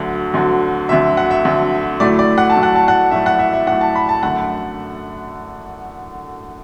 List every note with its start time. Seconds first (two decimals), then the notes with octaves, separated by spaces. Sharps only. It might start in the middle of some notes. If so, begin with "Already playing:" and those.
Already playing: D2 D3 F#3
0.34 D2 D3 F#3
0.89 D2 D3 F#3 E5
1.17 F#5
1.31 E5
1.45 D2 D3 F#3
2.00 A2 F#3 A3 D5
2.19 D5
2.38 F#5
2.50 A5
2.56 A2 F#3 A3
2.63 F#5
2.75 A5
2.88 F#5
3.11 A2 F#3 A3 E5
3.26 F#5
3.39 E5
3.54 E5
3.67 A2 F#3 A3 F#5
3.81 A5
3.96 B5
4.09 A5
4.23 F#2 D3 A3 F#5